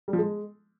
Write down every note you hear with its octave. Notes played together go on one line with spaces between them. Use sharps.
G3
F3
G#3